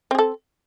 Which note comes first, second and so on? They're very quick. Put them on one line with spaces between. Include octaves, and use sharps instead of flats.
C4 G#4 A4